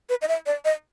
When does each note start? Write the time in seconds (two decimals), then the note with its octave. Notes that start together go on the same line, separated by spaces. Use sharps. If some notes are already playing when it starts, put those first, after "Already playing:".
0.09 B4
0.22 D#5
0.28 E5
0.46 D5
0.65 D#5